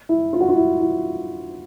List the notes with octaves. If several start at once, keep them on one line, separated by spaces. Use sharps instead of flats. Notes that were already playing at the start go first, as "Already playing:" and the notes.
E4
F4
F#4
F4
E4
E4